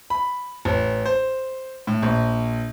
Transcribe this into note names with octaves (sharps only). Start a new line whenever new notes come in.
B5
A1
C5
A2
A#1